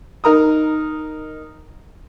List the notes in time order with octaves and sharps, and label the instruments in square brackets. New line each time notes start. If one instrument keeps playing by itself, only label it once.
[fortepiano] D#4 A#4 A#5 D#6